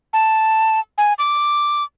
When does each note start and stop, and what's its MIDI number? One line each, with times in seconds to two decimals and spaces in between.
0.13 0.80 81
0.98 1.13 80
1.19 1.84 86